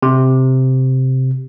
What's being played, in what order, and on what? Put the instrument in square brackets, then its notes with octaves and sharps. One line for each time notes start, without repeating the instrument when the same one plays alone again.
[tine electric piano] C3